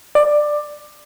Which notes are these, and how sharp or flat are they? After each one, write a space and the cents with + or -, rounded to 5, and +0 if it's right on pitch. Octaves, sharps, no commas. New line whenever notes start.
D5 +15